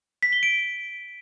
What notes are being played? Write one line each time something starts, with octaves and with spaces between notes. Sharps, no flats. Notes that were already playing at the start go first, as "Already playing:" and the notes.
B6
G7
D7